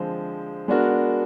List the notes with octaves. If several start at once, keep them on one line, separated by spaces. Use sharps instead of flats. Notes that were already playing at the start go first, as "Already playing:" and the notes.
Already playing: D3 F3 G#3 C4
G#3 B3 D4 F#4 A#4